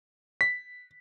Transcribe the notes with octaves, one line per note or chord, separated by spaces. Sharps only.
B6